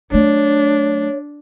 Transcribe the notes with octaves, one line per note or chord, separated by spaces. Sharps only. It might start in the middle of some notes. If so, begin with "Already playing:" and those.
F#3 A3 D4 C#5